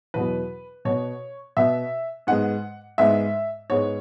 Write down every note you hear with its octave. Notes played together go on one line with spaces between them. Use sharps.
E2 B2 F#3 B3 B4
B2 B3 C#5
B2 B3 E5
G#2 G#3 B3 F#5
G#2 G#3 B3 E5
G#2 G#3 B3 C#5